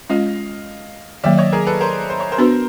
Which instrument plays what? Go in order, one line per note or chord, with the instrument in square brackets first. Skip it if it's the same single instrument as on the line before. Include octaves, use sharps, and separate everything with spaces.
[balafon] G#3 C#4 F4 [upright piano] D#5 F5
[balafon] D#3 F#3 A#3 [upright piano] D5 E5
[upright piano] C#5 D#5
G#4 A#4
A4 B4
A#4 C5
C5
C#5
A#4 C5
[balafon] B3 D4 F#4 B4